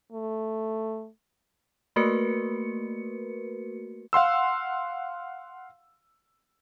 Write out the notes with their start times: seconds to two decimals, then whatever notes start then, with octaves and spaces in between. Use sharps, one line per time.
0.12 A3
1.96 A3 A#3 F#4 A#4 B4 C#7
4.13 F5 F#5 C6 E6